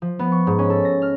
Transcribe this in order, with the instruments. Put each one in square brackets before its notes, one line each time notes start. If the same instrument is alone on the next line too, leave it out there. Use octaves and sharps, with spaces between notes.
[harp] F3
B3
C#6
G#2
C#4
A4
A#6
F6